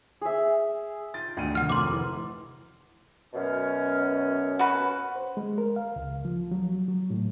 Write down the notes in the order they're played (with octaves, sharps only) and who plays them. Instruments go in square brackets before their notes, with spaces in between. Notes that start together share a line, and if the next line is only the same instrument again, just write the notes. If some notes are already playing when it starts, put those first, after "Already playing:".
[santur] G#4 E5
[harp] D#4 F4 G5 [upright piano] A6
[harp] G#1 [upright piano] D2 F#4 D#7
[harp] C3 D#3 F3 [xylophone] F#5 F6
[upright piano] F1 [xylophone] C6 D6
[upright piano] E3
[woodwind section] F#2 B2 C#4
[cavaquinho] F#4 B4
[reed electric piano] C5
G#3
A#4
F5
C#2
F3
F#3
F#3
A2